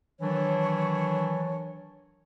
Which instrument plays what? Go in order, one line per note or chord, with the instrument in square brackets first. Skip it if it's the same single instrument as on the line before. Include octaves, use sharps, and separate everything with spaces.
[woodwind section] D#3 E3 F#3 D4 C#5